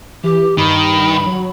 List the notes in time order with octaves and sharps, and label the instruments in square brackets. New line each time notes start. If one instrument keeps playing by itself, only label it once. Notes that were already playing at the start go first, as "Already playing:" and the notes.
[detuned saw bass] E3 [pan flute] G4
[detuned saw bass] G2 [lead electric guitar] D#3 [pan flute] B5
[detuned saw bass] F#3